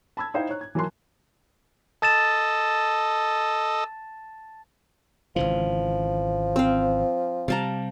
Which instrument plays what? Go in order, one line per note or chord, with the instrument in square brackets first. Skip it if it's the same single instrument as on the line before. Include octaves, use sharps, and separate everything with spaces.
[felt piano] A5 B5 E6 G#6
D#4 E4 C5 F5 G5
C#5 A#5 F#6
G#6
E3 F#3 A#4 A5 C6 F#6
[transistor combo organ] A4 D#5 [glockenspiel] A5 A6 E7
[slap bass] G#1 C#3 E3 [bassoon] F3
[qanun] C4 F5
[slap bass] C3 G3 [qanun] F5 A5 A#5